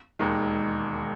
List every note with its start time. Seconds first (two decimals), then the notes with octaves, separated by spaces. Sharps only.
0.19 E1 D#2 D#3 G#3